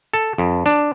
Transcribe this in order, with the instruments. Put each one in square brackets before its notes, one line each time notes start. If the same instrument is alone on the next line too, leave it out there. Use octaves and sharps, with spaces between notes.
[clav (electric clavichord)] A4
F2
D4